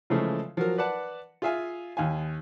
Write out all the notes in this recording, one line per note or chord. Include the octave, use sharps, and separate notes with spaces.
C#3 E3 F3 G#3 A3
F3 F#3 A#4
B4 D5 F#5 A5
F4 G#4 E5 F5 G#5
D#2 F5 G#5